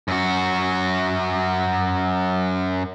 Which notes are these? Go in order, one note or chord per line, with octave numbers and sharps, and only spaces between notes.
F#2 F#4